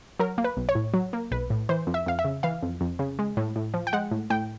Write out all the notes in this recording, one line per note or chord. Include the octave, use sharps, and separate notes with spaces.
F#3 A#4
A#3
B4
B1
C#5
A2
F#3
A#3
B1 B4
A2
E3 C5
F2
E5
F2 F5
E5
C#3
E3 F5
F2
F2
C#3
G#3
A2
A2
F3
G5
G#3 F#5
A2
A2 G5